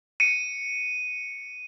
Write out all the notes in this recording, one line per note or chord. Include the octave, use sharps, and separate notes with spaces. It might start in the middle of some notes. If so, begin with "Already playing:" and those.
C#7 D#7